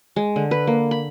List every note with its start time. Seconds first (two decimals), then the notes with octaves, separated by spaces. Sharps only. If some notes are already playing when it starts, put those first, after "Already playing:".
0.16 G#3
0.36 D3
0.51 B4
0.67 A#3
0.91 B5